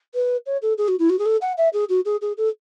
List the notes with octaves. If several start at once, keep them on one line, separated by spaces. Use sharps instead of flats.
B4
C#5
A4
G#4
F#4
E4
F#4
G#4
A4
F#5
E5
G#4
F#4
G#4
G#4
A4